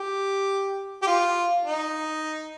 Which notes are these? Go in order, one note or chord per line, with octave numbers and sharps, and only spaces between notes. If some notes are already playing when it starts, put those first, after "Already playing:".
Already playing: G4
G4
F4
D#4